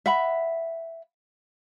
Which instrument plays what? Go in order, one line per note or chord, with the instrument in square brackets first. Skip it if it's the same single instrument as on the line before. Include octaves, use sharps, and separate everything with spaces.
[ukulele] E5 F#5 B5